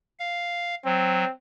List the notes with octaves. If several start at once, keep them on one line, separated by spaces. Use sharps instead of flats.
F5
F#3 C4